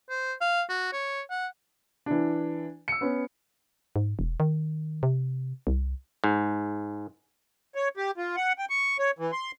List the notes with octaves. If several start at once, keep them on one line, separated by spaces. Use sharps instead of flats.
C5
F5
F#4
C#5
F#5
E3 D4
E6 C#7
B3 C#4
G#2
E1
D#3
C3
C2
G#2
C#5
G4
F4
F#5
G5
C#6
C#5
E3
C6